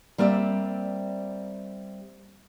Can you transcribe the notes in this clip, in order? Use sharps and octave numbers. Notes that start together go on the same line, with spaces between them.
G3 A#3 C4 D5 E5